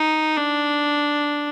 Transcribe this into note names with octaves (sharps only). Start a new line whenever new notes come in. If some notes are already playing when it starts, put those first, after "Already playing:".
Already playing: D#4
D4